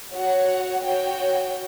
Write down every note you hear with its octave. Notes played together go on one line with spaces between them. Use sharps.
F#4 C#5 F#5
F#4 C#5 G5